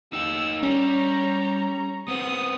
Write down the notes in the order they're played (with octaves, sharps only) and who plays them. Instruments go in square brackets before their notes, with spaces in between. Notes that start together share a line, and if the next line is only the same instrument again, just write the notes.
[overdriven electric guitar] D#4 G4 [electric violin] E6
[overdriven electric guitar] G3 [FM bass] C#4 [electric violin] C#5 A#5
[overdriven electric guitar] B3 C4 [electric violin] D#6